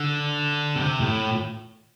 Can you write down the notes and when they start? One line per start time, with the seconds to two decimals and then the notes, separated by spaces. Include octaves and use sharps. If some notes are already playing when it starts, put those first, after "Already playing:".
Already playing: D3
0.76 C3
1.00 A2